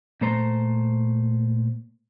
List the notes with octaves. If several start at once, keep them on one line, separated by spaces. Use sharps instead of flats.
A#2 A3 C5 A#5 C6